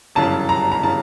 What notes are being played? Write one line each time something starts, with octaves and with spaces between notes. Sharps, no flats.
G1 F#2 C#3 E3 A5
A#5
A#5
C#3 E3 A5